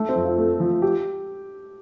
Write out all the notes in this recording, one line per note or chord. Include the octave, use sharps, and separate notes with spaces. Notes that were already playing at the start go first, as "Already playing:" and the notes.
Already playing: A3
C4
F2
F4
A3
F3
G4